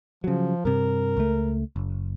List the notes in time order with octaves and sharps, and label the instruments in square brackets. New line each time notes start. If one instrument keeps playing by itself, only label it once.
[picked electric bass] C#3 F#3 [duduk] F3
[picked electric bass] G2 C3 [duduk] A#4
[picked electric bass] C#2 A3
F#1